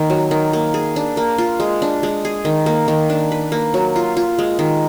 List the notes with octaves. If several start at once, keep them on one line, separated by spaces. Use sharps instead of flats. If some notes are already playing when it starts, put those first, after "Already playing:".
Already playing: D#3 A#3
F#3
D#3
A#3
G#4
D4
A#3
F4
G#3
D4
G#3
G#4
D#3
A#3
D#3
D4
B4
A#3
F#3
F4
F4
G#3
D#3